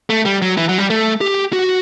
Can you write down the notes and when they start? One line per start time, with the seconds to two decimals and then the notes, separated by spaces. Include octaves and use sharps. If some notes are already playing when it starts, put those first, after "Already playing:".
0.10 A3
0.25 G3
0.42 F#3
0.57 E3
0.69 F#3
0.78 G3
0.90 A3
1.21 G4
1.53 F#4